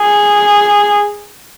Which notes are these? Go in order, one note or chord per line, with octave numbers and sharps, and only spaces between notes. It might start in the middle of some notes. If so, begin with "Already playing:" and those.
Already playing: G#4